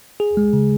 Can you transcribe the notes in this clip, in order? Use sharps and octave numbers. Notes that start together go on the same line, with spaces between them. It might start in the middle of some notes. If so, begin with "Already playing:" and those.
G#4
G#3
C#3